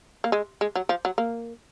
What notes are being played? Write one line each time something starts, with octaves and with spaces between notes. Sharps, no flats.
A#3
G#3
G#3
F#3
F3
F#3
A#3